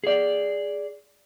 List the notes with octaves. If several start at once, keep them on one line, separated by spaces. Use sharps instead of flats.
G#4 D5